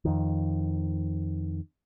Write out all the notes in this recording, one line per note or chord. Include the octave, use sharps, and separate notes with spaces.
F2 D#3